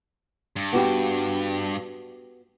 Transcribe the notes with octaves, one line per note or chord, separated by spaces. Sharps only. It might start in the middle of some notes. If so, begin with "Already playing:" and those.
G2
B3 F#4 G4